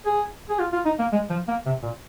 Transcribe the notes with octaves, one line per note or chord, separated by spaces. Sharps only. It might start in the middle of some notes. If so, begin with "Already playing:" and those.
G#4
G#4
F4
F4
D#4
A#3
G#3
F3
A#3
C3
A#2